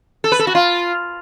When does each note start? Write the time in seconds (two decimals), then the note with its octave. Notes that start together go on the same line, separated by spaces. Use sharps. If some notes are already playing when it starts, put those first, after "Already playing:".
0.24 A4
0.32 B4
0.39 A4
0.47 F#4
0.55 F4